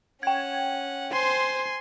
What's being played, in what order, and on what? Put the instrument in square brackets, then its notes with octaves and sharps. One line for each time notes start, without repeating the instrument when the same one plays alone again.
[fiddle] C#4 F#5 [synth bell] G5 G#6
[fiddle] C5 [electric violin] G#5 C6